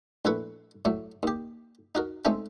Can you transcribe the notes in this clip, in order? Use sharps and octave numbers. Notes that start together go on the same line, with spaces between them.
A#1 A3 E4 B4 C#6
A2 F#3 A3
D#2 G4
D#4 F#4 A#4
G#3 A3 C4 C#4 D#4 A4